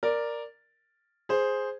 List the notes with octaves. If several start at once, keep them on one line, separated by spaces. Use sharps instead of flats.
A#4 D5
G#4 C5